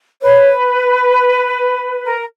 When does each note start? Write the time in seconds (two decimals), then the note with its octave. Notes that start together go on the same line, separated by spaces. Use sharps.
0.22 B4 C#5
2.05 A#4